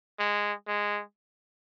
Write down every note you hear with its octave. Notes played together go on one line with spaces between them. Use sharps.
G#3
G#3